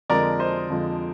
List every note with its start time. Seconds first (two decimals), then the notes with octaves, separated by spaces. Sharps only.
0.09 F2 D3 F3 G#3 A#4 D5
0.39 C5 D#5
0.69 F2 D3 F3 G#3